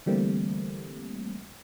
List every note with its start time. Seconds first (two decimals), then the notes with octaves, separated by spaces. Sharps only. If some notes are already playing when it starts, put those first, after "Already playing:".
0.06 D3 E3 G3 A3 A#3 C4